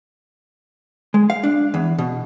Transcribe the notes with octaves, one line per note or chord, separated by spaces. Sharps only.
G#3
F5
D4
E2
B2